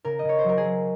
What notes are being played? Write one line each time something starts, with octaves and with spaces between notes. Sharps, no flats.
C#3 A#4
D#5
C#3 C#5
C5
F#3 A#4
G#4
F#3